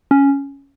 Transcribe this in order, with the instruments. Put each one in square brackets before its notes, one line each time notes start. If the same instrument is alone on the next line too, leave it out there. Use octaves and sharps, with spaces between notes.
[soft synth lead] C#4